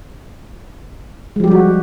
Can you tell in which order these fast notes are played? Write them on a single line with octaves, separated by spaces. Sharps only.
G#3 F3 G4 G3 F#4